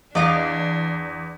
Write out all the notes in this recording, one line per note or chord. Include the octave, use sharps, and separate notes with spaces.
E2 D4 D5 D#5 F5